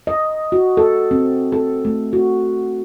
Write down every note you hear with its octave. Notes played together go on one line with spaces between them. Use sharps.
D#5
F#4
A4
C4
A4
A3
F#4